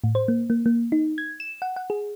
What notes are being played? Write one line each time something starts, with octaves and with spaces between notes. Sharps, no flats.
A2
C5
A#3
A#3
A#3
D#4
G#6
E7
F#5
F#5
G#4